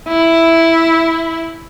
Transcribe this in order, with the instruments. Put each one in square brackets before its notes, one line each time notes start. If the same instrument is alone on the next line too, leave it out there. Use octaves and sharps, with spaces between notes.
[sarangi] E4